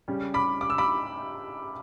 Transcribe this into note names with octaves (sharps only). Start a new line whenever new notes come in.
C#3 G3 C#4
B5 D6
D6
E6
B5 D6